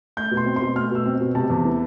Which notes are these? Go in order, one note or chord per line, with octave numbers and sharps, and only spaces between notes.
A3 G6
B2
C6
C4
B2 C6
A3 F6
B2 E6
C4
B2
C3 A5
E2
E3